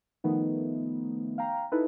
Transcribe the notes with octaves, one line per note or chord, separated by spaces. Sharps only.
D#3 F3 A3 B3 D#4
F5 G5 A#5
D#4 E4 A4 B4